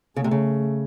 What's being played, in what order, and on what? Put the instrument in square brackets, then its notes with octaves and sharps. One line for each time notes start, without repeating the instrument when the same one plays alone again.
[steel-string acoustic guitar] C#3 [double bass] A3
[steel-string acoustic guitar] C3
C#3